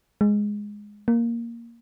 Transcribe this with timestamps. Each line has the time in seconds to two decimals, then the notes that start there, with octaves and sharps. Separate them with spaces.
0.21 G#3
1.08 A#3